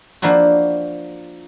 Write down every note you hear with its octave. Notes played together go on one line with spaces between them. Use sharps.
F3 A#3 D4 E4 F#4